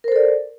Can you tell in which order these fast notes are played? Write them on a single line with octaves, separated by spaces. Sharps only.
A#4 C5 A4 D5